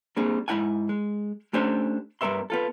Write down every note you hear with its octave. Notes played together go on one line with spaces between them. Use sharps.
G3 A#3 C4 D4 G#4
G#2 F#3 E4 F#5 G#5
G#3
A3 C#4 D4 G4 C5 G#5
G2 B3 A#4 C#5 E5 C6
B3 F4 A4